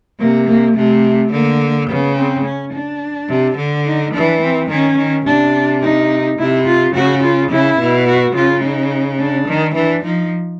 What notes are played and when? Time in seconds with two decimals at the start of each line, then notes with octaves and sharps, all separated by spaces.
0.20 C3 A#3
0.48 A#3
0.77 C3 A3
1.32 D3 A#3
1.88 C#3 B3
2.16 C4
2.44 C#4
2.73 D4
3.29 C3
3.57 D3
3.86 D#4
4.14 E3 D4
4.42 C4
4.70 D#3 C#4
4.98 D#3
5.26 C3 D4
5.82 D#4
6.39 C3 E4
6.66 F4
6.94 C#3 F#4
7.23 F4
7.50 C#3 E4
7.79 B2
8.07 F#4
8.35 C#3 F4
8.63 D#4
9.20 D4
9.48 D#3
9.75 E3 D4
10.03 F3 D#4